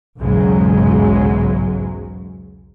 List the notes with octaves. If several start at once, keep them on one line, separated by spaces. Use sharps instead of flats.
B1 E2 G#2 C#3 F#3 G#3